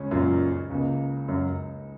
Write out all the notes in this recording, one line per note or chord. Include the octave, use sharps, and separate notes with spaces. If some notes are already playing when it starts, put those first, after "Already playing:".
Already playing: C#2 C#3 G#3 C#4
F#2 A#2
C#2 C#3 A#3
F#2